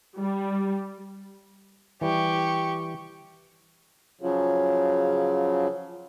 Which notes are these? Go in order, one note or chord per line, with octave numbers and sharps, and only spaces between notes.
G3
E3 G3 G4 C#6
C#3 F3 F#3